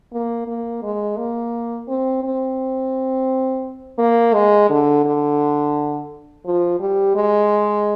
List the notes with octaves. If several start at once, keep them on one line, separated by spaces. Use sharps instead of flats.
A#3
A#3
G#3
A#3
C4
C4
A#3
G#3
D3
D3
F3
G3
G#3